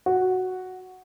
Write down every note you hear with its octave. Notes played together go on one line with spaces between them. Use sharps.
F#4